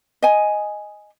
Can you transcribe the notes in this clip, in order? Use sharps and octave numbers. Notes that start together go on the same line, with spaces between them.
D#5 G#5